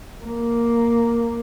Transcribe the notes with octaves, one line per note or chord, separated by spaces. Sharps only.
A#3